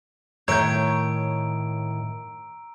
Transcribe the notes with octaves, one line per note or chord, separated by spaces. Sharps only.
A2 D#3 C#5 E5 A#5 E6 G6 D7